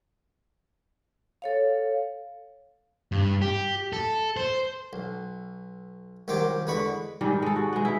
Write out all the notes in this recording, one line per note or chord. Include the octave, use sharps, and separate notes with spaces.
A4 C#5 F5
G2
G4
A4
C5
B1
C2 D#3 F#3 G4 C5 D6
E2 D3 G#3 B4 B5 C#6
G#2 D#3 G3 G#3
G#3 A4
F#4
G#3 B3
D#4 E4